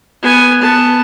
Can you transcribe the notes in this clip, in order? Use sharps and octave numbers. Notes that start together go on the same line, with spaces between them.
B3 G#5
B3 A5